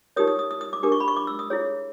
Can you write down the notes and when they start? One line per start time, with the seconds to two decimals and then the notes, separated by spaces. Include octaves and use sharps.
0.16 D#4 G4 A#4 C#5 D#6
0.28 D#6
0.39 D#6
0.51 D#6
0.61 D#6
0.73 D6
0.83 D4 G4 A#4 D6
0.92 C#6
1.00 B5
1.08 C#6
1.16 D6
1.27 E6
1.39 D#6
1.50 E4 G#4 C#5